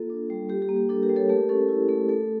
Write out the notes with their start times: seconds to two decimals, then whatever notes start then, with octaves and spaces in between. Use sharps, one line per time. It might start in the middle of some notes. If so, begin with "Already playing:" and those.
Already playing: A#3 F4 A4
0.10 D4
0.30 G3
0.49 G3 G4
0.62 G4
0.69 A#3
0.76 G4
0.89 D4 A4
1.02 G4 A#4
1.09 G3
1.16 A4 C#5
1.29 A3 G4 A#4
1.49 C#4 A4
1.69 E4
1.89 A3
2.09 A3 A4